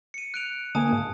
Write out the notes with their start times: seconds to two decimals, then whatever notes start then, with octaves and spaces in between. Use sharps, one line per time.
0.14 C#7 D#7
0.34 F#6 D7 F7
0.75 D2 A#3 G#5 A5 D#6
0.92 G#2